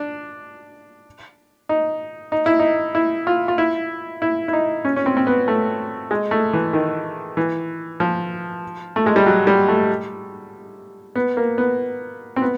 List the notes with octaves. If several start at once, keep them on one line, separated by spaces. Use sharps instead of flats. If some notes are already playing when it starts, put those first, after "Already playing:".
Already playing: D4
D#4
D#4
E4
D#4
E4
F4
F4
E4
E4
E4
D#4
C#4
C#4
C4
C4
B3
A3
G#3
A3
E3
D#3
E3
F3
A3
G#3
G3
F#3
G3
A3
B3
A#3
B3
C4
B3